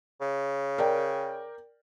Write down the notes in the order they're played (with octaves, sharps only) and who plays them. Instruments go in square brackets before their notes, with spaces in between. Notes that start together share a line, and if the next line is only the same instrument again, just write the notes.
[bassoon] C#3
[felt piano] A#4 D5 G5